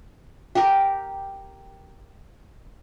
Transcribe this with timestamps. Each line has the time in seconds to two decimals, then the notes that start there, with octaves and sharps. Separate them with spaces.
0.55 G4 A#4